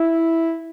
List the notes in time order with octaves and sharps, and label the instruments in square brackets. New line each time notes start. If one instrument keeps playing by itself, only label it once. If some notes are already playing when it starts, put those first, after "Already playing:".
Already playing: [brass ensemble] E4